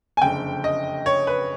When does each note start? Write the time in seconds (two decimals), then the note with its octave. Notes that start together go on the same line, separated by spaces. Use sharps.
0.17 G#5
0.21 F#1 F2 D3 G5
0.64 D#5
1.06 C#5
1.27 B4